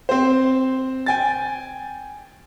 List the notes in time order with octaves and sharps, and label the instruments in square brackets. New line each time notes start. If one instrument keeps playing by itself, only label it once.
[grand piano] C4 C5
G5 G#5 A6